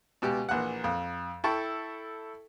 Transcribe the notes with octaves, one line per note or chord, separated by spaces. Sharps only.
C#2 B2 G4
A#1 E3 F#5
F2
E4 A4 G5 A5 C#6